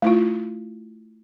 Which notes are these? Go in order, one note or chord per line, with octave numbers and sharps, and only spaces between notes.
A3 E4 F4